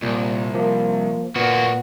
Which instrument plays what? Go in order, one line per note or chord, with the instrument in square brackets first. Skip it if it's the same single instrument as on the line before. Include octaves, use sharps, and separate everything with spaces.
[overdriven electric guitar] C2 [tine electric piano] A#2
[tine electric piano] F3 A#3
[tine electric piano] A#2 B3 [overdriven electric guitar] A#3 F#4